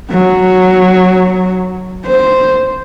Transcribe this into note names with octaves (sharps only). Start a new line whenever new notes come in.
F#3
C5